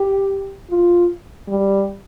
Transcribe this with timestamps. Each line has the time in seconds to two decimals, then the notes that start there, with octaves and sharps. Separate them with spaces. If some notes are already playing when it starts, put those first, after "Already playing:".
Already playing: G4
0.70 F4
1.48 G3